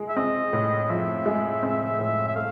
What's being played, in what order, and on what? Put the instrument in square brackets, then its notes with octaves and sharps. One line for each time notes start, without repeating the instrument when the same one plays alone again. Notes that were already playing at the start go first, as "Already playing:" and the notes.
Already playing: [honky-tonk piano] G#3
[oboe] E5
[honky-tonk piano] C4 [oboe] D#5
[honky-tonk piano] A2
[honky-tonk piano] F3 [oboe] E5
[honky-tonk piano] G#3
C4
A2
[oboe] E5
[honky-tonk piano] A3 [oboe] F5